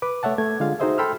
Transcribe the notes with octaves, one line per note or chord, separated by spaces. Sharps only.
B4 D6
A3 C#5 E5 F#5 A5
A3 G#6
D3 G#3 F4 F5
D#4 F#4 G#4 C5 D#5 E5
A4 G5 B5 C6 E6 F6